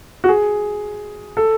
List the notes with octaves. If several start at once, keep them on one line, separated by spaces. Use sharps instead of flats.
F#4
G#4
A4